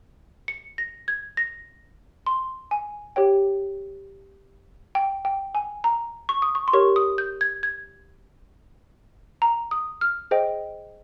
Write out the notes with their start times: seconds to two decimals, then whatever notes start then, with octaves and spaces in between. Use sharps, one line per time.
0.48 C#7
0.78 A#6
1.08 G#6
1.37 A#6
2.27 C6
2.71 G#5
3.16 G4 C#5 G5
4.95 G5
5.25 G5
5.55 G#5
5.84 A#5
6.29 C#6
6.42 D#6
6.55 C#6
6.68 C6
6.73 G4 A#4 C#5 C#6
6.96 D#6
7.18 G6
7.41 G#6
7.63 G#6
9.42 A#5
9.71 D#6
10.01 F6
10.31 G#4 C5 D#5 G5